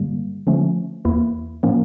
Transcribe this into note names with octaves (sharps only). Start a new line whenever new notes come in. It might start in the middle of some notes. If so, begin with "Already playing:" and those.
Already playing: G2 D3 G3 A#3
D3 F3 A3 C#4
E2 E3 A#3 E4
A2 F3 A#3 C#4